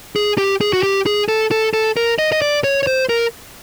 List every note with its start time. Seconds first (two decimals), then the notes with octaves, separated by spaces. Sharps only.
0.16 G#4
0.38 G4
0.61 G#4
0.73 F#4
0.83 G4
1.06 G#4
1.28 A4
1.51 A4
1.74 A4
1.97 A#4
2.19 D#5
2.32 D#5
2.42 D5
2.64 C#5
2.83 C#5
2.87 C5
3.09 A#4